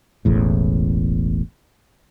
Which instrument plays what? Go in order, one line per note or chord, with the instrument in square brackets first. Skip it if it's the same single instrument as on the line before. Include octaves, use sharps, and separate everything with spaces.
[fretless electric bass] E1 A1 E2 A2